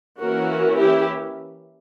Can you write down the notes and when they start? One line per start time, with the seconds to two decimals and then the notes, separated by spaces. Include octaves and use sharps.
0.20 E3 A#3 C#4 F#4 A#4
0.79 E4 G4